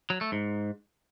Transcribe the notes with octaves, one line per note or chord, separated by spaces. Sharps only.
F#3
A3
G#2